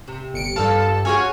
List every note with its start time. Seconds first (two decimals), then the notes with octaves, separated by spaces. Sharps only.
0.08 C3
0.34 G1 C#7 D7
0.56 G2 F4 A4 F5 A5
1.05 C#4 F4 F#4 G#4 C#5 G#5